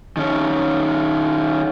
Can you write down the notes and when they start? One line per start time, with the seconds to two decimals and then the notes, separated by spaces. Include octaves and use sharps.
0.17 D#3 C#4